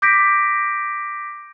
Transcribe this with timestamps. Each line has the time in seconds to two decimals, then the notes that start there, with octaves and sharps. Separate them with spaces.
0.02 D6 G6 A#6 B6 D7